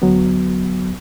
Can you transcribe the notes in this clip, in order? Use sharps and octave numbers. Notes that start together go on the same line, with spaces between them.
D2 F#3 B3